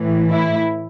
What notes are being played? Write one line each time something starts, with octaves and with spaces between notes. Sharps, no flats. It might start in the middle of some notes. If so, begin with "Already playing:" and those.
Already playing: A2 E3
E4